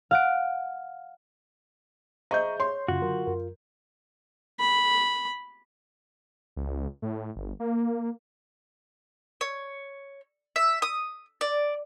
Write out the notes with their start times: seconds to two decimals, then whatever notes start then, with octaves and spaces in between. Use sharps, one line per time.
0.11 F5 F#5 D7
2.31 G#4 C5 D#5 E5 A#5 C#6 G6
2.60 C#5 C6
2.88 F#2 C#3 F4 F#4
3.02 D3 F#3 A#4
3.27 F#2 A#4
4.60 B5
6.56 C#2
7.02 A2
7.36 G1
7.60 A#3
9.41 C#5
10.56 E5
10.82 D#6
11.41 D5